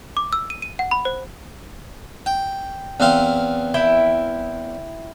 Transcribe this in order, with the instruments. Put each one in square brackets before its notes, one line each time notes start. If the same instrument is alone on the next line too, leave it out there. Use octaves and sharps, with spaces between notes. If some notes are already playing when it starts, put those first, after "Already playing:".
[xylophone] D6
E6
D#7
D#7
F#5
B5
C5
[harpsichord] G5
E2 C4 F5
[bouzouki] E4 E5 G5